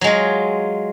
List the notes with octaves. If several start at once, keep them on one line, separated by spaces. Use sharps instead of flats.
F#3 G#3 F4